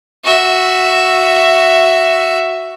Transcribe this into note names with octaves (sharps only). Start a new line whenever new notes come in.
F#4 E5